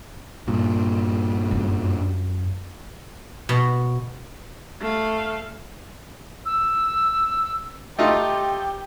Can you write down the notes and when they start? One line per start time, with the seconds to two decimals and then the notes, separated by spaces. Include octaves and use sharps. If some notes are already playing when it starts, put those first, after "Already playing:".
0.48 G2 A#2
1.51 F#2
3.49 B2
4.80 A3 F5
6.46 E6
7.99 A3 D#4 F4 G4